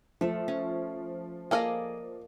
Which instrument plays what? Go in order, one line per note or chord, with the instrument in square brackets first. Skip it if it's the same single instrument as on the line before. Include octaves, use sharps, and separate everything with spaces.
[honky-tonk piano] F3 [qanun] A3 A4
[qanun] C#4
[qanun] A#3 D5 D#5 [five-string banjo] G#4 A4 F5